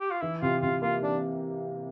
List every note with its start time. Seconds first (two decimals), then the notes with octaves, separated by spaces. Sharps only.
0.01 G4
0.11 F4
0.21 E3 E4
0.42 C3 F4
0.62 C3 F4
0.82 A#3 F4
1.02 E3 D4